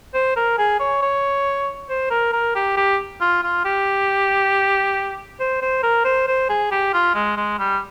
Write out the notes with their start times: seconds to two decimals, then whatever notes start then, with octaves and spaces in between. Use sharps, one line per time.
0.14 C5
0.36 A#4
0.58 G#4
0.79 C#5
1.02 C#5
1.89 C5
2.10 A#4
2.33 A#4
2.55 G4
2.77 G4
3.21 F4
3.43 F4
3.65 G4
5.40 C5
5.62 C5
5.83 A#4
6.05 C5
6.27 C5
6.49 G#4
6.71 G4
6.93 F4
7.14 G#3
7.37 G#3
7.59 G3